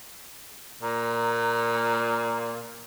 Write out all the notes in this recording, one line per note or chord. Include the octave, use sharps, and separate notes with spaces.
A#2 A#5